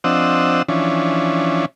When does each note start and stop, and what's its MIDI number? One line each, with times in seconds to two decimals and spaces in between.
0.04 0.62 53
0.04 0.62 60
0.04 0.62 62
0.04 0.62 75
0.04 0.62 78
0.04 0.62 88
0.68 1.66 52
0.68 1.66 53
0.68 1.66 61
0.68 1.66 62